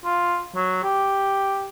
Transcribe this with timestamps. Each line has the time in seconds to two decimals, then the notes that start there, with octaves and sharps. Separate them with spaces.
0.05 F4
0.56 F#3
0.84 G4